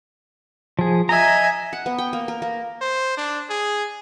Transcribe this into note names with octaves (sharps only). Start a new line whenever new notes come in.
F3 G#4
D#5 E5 G#5 A#5
F#5
B3
G5
A#3
A#4
A#3
C5
D4
G#4